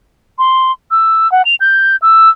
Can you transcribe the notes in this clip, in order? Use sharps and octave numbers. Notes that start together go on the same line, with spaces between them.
C6
E6
F#5
F7
G6
E6